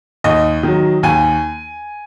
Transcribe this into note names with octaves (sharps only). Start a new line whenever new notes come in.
D#2 D#5
D#3 F#3
D#2 G#5